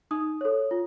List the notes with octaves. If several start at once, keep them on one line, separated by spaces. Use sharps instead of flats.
D#4 D#6
A4 C#5
F4